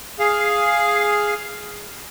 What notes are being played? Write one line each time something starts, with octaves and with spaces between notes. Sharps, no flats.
G#4 F5